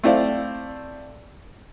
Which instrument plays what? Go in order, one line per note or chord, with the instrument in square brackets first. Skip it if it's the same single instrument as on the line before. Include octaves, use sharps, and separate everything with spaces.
[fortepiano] A3 C4 E4 C5 D5 F5